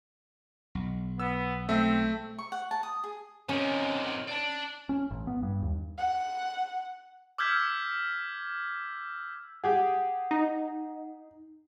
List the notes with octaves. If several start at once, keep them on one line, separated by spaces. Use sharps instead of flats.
B1
B3 E6
A3 C4 E5
C#6
F#5
A5
D#6
G#4
C3 D#3 C#4
D5 A5
C#4
A1
B3
G2
D#2
F#5
D6 E6 F6 G6 G#6 B6
G4 G#4 F#5
D#4